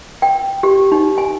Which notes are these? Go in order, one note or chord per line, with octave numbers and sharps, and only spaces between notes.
G5
G4
D#4
G#5